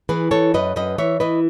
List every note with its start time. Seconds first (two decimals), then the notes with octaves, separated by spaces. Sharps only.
0.09 E3 G#4 B4
0.31 E3 A4 C#5
0.54 F#2 B4 D#5
0.76 F#2 B4 D#5
0.98 E3 C#5 E5
1.20 E3 B4 D#5